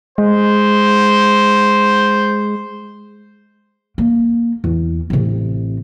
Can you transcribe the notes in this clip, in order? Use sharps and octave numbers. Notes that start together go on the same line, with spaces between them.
G#3 C5
A#3
E2
A1 C3